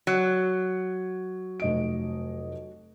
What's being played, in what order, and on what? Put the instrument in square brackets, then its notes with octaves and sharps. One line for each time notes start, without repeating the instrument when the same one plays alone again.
[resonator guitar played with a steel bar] F#3
[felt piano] F1 D#5 D7